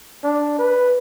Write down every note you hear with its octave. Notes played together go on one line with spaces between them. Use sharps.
D4
B4